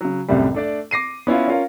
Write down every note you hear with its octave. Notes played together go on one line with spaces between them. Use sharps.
C#3 F#3
C2 F#2 A2 C3 G3
A3 D4 D5
D6 A#6 C7 D#7
B3 C#4 E4 F4
C#4 F4 A#4